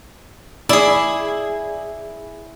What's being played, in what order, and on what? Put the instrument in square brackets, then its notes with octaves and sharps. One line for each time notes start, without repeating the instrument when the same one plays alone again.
[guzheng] E4 G#4 [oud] D5